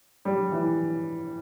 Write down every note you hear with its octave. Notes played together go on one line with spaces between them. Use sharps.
G3
E3